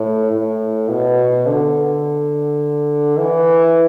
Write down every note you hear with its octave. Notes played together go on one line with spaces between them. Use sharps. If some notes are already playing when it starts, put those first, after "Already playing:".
Already playing: A2
A2
B2
D3
E3